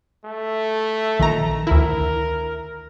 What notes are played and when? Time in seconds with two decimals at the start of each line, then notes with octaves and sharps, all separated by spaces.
0.25 A3
1.19 A#1 D#3 A#5
1.67 D2 E4 A#4